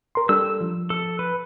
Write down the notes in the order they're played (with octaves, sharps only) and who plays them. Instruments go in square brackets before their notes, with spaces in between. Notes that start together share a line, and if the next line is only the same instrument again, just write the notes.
[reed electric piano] A#4 C6
[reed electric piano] G3 D4 A4 [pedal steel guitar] E6
[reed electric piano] F3
[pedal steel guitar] A4
B4